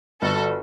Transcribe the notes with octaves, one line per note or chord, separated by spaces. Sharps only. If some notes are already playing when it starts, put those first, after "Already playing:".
G1 F#4 A4